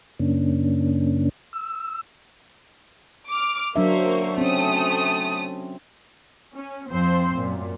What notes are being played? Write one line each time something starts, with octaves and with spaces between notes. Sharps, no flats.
F#2 C#3 A#3 C#4 D4
E6
D6 F6
F#3 A#3 D4 C5 E5 C#6
A3 C4 C#4 D#6
C#4
F2 F3 C4 C5 C6
F#2 A#2